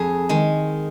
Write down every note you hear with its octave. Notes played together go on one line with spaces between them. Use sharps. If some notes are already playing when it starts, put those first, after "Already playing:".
Already playing: F2 G#4
D#3 G#3